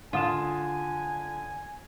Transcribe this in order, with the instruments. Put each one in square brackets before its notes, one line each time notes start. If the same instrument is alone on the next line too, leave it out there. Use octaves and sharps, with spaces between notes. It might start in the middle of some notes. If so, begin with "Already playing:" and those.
[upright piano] D3 D#6 E7 [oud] F4 [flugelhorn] G#5